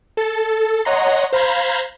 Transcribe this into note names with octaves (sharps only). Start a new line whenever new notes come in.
A4 A6
C#5 D#5 F#5 A#5 C6
C5 F5 A#5 B5 G6 G#6